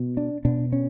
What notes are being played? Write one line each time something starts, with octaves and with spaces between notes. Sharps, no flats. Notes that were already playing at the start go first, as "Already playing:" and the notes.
Already playing: B2
D4
B2 D4
C#4